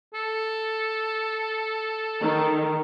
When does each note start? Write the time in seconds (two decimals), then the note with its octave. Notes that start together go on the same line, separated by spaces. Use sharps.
0.14 A4
2.21 D#3